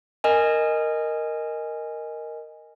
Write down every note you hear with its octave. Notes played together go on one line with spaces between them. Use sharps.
A#4 D#5 G#5